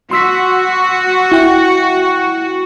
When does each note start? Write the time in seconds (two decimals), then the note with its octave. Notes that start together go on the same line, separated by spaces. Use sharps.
0.11 F#4 C6 E6 B6
1.32 E4 G5